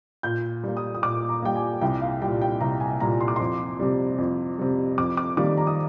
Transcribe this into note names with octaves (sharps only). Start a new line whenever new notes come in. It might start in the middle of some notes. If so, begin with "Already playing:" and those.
A#2 G6
G3 A#3
D#6
D#6
A#2 D6
A#5
G3 A#3 G5
G#5
C2 G5
F5
A#2 G3 G5
G5
C2 A#5
G#5
A#2 G3 A#5
C6
D6
F2 C6
C3 G3
F2
C3 G3
F2 D6
D6
D#3 G3 A#3 D6
A#5
D#6